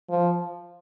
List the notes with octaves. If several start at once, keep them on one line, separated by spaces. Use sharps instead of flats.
F3